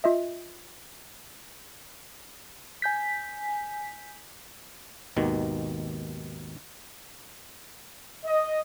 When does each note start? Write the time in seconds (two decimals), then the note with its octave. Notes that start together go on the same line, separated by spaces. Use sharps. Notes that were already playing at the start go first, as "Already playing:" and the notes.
0.04 F4 D#5 E5
2.82 G#5 G6 B6
5.17 G#1 D#2 B2 D#3
8.25 D#5